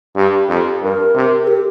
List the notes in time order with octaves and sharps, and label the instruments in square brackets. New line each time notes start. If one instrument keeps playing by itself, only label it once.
[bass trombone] G2 [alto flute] G4
[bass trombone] F2
[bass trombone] G2 [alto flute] A#4
[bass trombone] C3
[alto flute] A#4
G4